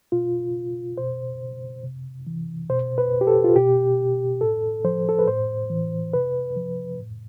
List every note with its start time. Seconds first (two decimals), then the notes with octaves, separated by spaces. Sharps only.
0.12 B2 F4
0.98 B2 C5
1.83 C3
2.27 E3
2.70 B2 C5
2.98 B4
3.21 G4
3.27 A4
3.44 F4
3.56 B2 G4
4.41 A2 A4
4.85 F3 C5
5.09 A4
5.19 B4
5.27 A2 C5
5.70 E3
6.14 C3 B4
6.56 F3
6.99 A2